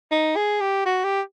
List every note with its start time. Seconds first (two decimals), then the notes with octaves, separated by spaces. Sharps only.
0.11 D#4
0.36 G#4
0.60 G4
0.86 F#4
1.04 G4